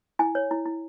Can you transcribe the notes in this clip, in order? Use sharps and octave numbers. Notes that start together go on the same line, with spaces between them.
E4 G#5
C#5
E4
E4